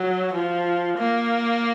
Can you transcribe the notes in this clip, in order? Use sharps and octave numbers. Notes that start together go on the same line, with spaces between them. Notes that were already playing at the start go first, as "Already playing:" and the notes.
Already playing: F#3
F3
A#3